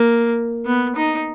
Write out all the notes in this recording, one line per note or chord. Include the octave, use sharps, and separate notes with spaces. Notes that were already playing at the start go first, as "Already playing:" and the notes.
Already playing: A#3
B3
D#4